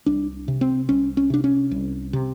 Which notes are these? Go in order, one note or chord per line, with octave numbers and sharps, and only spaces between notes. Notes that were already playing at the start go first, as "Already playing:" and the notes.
C2 D4
C3
C4
C2 C#4
C#4
C3 D4
C#4
C2
C3